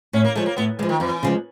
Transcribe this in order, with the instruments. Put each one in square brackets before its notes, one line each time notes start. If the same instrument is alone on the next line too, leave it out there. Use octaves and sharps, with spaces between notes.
[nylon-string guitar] A2 [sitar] C#4
[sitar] A#3
[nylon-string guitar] F3 G#3 [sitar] A3
[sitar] A#3
[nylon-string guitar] A2 [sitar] B3
[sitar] E3 [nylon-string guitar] F3 G#3
[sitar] D#3
[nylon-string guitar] F2 [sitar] E3
[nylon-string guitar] C#3 F3 G#3